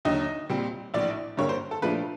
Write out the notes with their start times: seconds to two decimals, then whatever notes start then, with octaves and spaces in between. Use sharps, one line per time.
0.05 D#2 D3 F#3 D#5
0.49 A#2 G3 C4
0.94 A#1 A2 E3 D5
1.37 G2 D3 G3 A#3 C#5
1.49 C5
1.71 A4
1.82 A#2 F3 A3 D4 B4